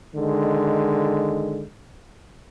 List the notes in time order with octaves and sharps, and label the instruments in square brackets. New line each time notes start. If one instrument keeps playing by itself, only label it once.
[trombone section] D3 D#3 G#3